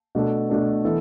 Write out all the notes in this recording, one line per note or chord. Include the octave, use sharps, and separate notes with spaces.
B2 A3 D4 A4
B2 A3 D4 A4
E3 B3 E4 A4